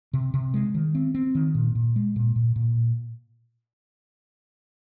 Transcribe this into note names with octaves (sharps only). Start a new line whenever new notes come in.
C3
C3
G#3
D#3
C4
C4
D#3
A#2
A#2
G#3
A#2
A#2
A#2